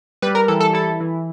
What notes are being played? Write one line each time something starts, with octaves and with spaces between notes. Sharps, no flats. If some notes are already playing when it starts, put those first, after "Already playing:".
G3 B4
A#4
E3 A4
A4
E4 A4
E3